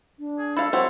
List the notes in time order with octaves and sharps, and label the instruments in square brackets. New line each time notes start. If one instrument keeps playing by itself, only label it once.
[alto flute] D4
[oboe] G#4
[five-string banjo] E4 F5 [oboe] A4
[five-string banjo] F#3 C4 E4 [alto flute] F#5